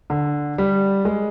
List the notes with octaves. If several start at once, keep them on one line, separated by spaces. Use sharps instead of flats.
D3
G3
G#3